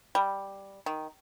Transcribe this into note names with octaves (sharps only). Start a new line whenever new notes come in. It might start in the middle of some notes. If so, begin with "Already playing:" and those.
G3
D#3